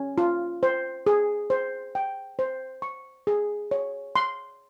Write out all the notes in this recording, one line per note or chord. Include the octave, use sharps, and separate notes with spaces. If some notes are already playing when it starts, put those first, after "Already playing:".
Already playing: C#4
F4
C5
G#4
C5
G5
C5
C#6
G#4
C#5
C6